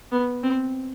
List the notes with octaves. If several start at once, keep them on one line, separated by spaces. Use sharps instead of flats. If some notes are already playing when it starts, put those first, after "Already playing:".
B3
C4